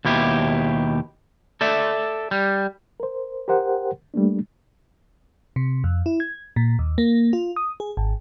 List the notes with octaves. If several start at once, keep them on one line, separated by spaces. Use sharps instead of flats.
D#2 B2 E4 G4
A4 D5 E5
G3
A#4 C5
G4 A#4 C5 F#5 G5
G3 A3 A#3 D4
C3
F2
E4
G#6
A#2
D#2
A#3
F4
D#6
G#4
G#1